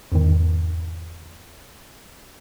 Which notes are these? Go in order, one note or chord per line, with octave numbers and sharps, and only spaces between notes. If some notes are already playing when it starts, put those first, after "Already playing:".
E2 G#2 D#3